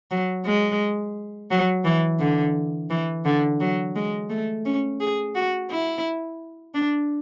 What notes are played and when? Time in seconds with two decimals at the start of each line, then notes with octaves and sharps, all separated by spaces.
0.11 F#3
0.46 G#3
1.51 F#3
1.85 E3
2.20 D3
2.90 E3
3.25 D3
3.60 F#3
3.96 G#3
4.30 A3
4.65 C#4
5.01 G#4
5.35 F#4
5.70 E4
6.75 D4